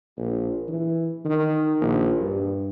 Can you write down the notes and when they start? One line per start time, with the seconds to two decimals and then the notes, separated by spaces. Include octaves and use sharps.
0.17 A#1
0.69 E3
1.25 D#3
1.81 A#1
2.20 G2